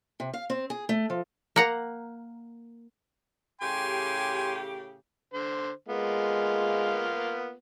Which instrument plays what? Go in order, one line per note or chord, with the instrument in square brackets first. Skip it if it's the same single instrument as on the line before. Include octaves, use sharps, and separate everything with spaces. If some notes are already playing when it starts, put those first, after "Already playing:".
[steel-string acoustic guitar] C3
F5
C4
G#4
A3
F3
[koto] A#3 F#5 A#5
[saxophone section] A2 C#3 G4 [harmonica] G#5 C6
[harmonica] D3 C5
[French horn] G#3 [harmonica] A#3 B3 F4